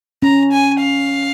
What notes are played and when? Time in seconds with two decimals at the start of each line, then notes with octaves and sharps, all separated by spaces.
0.22 C#4 A#5
0.52 G#5
0.80 F5